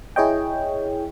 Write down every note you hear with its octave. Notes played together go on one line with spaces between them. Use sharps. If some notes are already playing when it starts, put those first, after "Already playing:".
E4 G#4 C#5 D#5 G5